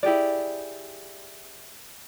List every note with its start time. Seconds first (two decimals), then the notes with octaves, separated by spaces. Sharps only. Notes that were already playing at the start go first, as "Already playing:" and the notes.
0.03 E4 G4 G#4 D5